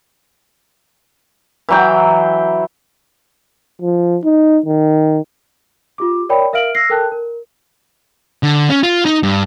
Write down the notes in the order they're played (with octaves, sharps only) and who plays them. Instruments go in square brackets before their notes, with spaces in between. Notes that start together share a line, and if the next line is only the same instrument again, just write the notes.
[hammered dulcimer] E3 F#3 G5
[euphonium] F3
D#4
D#3
[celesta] F4 G4 D6
A#4 C#5 D5 G5 B5
A#4 E5 F5 F6 D7 F#7
E6 F6 A#6 C7
A4 A#4 G5 A5 F#6
A#4
[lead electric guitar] D3
C#4
F4
D#4
G2